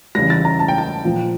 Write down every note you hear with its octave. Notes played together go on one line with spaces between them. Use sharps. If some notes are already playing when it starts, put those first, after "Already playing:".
E2 C#3 E3 G3 A#6
A6
A#5
A5
G5
A5
A#2 F3